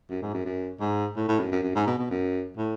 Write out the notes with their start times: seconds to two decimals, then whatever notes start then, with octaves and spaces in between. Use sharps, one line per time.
0.10 F#2
0.22 G#2
0.34 F#2
0.45 F#2
0.81 G#2
1.17 A2
1.29 A2
1.40 F#2
1.52 F#2
1.63 F#2
1.75 G#2
1.87 B2
1.99 B2
2.11 F#2
2.57 A2